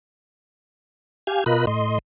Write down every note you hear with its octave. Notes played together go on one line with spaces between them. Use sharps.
G4 F5 G#5
B2 F4 A#4 D#5 B5 F#6
A2 D#5 C6